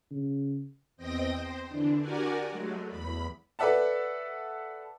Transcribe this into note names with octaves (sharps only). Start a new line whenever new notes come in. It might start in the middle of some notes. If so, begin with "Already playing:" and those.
C#3
E2 C4 D#5 G5 D#6 A#6
C5
D3 E3 D4
F#4 G4 A#4 D5 F#5 G#5
F#3 G#3 A3
E2 B5
A4 B4 D5 E5 F#5 A5